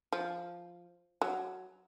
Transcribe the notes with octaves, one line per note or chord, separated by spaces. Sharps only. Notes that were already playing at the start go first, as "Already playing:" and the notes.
F3
F#3